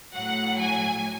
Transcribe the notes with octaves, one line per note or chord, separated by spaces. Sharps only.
A2 F#3 F#5
G#5